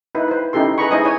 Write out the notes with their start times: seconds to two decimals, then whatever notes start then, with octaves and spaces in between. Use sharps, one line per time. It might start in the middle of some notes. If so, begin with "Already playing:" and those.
0.15 D#4 E4 B4
0.28 B4 C5
0.53 C#4 D#4 E4 G4 A4 C6
0.78 G#4 B4 D#5 A#5 B5 C#6
0.91 D#4 E4 C5 D#5 G#5 D#6
1.05 C#5 G#5